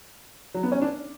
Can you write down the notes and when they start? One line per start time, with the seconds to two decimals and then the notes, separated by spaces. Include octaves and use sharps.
0.54 F#3
0.63 B3
0.72 C#4
0.82 D4